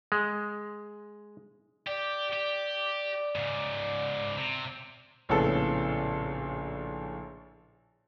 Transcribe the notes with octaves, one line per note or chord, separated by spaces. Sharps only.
G#3
G4 D5
G4
G#2 C#3
C3
A#1 A2 C#3 B3 A4